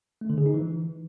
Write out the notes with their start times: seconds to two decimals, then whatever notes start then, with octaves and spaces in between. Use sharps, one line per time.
0.21 A3
0.30 D3
0.38 G#4
0.46 D#4
0.54 E3